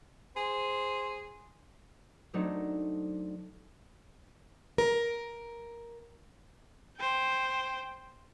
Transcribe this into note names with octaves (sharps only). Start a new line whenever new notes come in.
G#4 C5
F#3 A3 C4 D4 D#4 A4
A#4
C5 G5